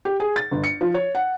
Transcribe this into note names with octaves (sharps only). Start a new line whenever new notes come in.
G4
G#4
A6
G1
C#7
F3
C#5
F#5